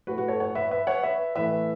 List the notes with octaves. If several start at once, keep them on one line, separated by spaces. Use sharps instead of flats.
A2 A3 F#4 B4
F#4 B4
A4 C#5
C#5 F#5
B4 E5
B4 E5
C#5 F#5
B4 E5
A2 E3 A3 B4 E5